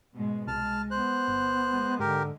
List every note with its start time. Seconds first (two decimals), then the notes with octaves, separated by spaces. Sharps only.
0.15 G#2 B2 G#3
0.48 C2 G#3 A5 F6
0.91 B3 C5 F#6
1.28 G1
1.70 G#3
2.00 G#2 D3 G4 A#4